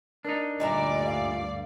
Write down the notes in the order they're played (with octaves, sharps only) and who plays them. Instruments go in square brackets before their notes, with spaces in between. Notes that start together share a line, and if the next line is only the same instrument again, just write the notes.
[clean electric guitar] D4 D#4 [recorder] A#4
[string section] D2 G2 D5 [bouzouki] A#2 E4 A#5 [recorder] D#5
[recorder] F5